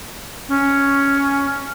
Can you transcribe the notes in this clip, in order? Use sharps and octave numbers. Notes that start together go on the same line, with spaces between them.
C#4